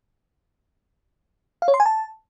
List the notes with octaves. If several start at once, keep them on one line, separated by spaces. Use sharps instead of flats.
F5
C#5
C6
G#5
A5